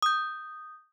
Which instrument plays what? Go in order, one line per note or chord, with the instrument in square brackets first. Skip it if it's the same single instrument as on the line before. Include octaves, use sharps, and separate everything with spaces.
[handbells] D#6 G6